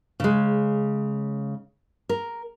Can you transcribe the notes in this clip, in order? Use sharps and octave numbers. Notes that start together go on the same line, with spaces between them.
C#3 G#3
A#4